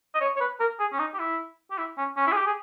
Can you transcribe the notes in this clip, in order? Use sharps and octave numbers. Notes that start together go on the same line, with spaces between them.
D#5
C#5
C#5
B4
A#4
G#4
C#4
D#4
G4
E4
G4
E4
C#4
C#4
E4
G#4
G4
G#4